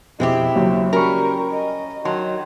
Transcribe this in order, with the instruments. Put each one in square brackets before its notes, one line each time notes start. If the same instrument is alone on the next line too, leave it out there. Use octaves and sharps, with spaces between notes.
[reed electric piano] F2 B2 [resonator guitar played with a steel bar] G#3 C4 G4 [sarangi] E4
[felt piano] D#2 [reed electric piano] C#3 F#3
[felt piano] F#3 C#4 [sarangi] G3 [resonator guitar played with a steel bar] A#4 [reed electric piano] A#5 B5 C#6
[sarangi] D#5
[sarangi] D#3 [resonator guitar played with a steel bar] F#3 [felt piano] A5 C6